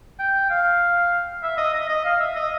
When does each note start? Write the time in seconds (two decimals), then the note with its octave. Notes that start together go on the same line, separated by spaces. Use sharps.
0.19 G5
0.50 F5
1.43 E5
1.58 D#5
1.74 D#5
1.89 D#5
2.05 F5
2.20 E5
2.36 D#5